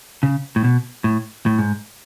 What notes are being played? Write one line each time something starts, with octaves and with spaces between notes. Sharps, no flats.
C#3
A2
B2
A2
A2
G#2